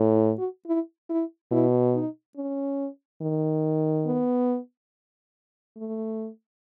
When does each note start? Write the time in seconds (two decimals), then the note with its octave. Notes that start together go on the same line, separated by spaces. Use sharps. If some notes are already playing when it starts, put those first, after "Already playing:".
Already playing: A2
0.11 E4
0.39 F#4
0.67 E4
1.10 E4
1.52 B2 E4
1.95 D#4
2.37 C#4
3.22 D#3
4.07 B3
5.77 A3